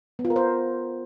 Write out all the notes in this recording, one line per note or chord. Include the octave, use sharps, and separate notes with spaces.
B3
F4
A#4
C5